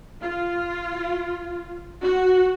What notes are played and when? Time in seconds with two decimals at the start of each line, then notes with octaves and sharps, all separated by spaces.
0.22 F4
2.02 F#4